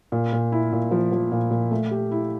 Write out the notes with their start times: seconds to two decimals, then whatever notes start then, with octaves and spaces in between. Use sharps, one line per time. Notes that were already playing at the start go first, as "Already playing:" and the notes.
0.12 A#2
0.33 A#2
0.52 E4
0.73 A#2
0.91 F3
1.12 F3
1.32 A#2
1.51 A#2
1.71 A3
1.91 G4
2.11 E4